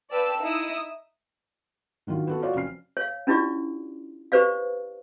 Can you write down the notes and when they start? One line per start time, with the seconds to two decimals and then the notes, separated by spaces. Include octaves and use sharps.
0.11 B4 D5 F5 G5 A5 E6
0.41 D#4 E4 D#6 E6
2.07 D3 D#3 F#3 F4
2.27 B3 F#4 A4
2.42 F4 F#4 C#5 D5 F5
2.55 F1 C4 C#4 F6 C7
2.97 C#5 F5
3.27 C#4 D4 E4 F4 G4 D5
4.32 G4 B4 C5 D5 F5